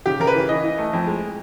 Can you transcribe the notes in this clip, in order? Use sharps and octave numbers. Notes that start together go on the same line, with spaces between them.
C#3 G4
C#3 A#4
B4
E3
E3 D#5
E3
A3
F2
G#3